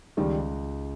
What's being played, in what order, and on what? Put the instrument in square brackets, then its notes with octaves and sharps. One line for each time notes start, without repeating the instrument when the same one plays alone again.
[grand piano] C#2 [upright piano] D#3 G3